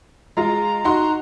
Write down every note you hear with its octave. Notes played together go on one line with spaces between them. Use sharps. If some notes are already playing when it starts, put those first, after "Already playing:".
G#3 F4 A#5
D#4 F#4 C6